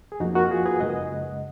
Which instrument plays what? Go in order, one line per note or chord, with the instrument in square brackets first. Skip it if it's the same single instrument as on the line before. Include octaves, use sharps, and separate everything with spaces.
[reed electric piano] G#4
F2 F3 A#3 D#4 F#4
F#4 A#4
F4 G#4
G#4 B4
F#2 C#3 G#3 D#5 F#5